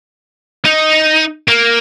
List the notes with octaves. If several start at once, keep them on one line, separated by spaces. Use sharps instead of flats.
D#4
A#3